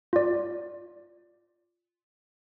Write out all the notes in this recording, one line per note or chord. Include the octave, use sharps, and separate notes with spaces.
F4 D5